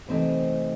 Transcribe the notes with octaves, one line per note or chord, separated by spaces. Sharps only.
C3 E3 A3 C4 D#4